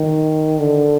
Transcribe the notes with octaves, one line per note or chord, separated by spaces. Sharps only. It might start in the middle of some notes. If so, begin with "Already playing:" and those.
Already playing: D#3
D3